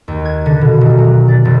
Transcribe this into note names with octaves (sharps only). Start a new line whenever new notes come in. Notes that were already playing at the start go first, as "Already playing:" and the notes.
D#2
G#6
D3
B2
D#1
F#3
D5
E1